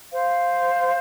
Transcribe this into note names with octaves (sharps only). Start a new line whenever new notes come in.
C5 F5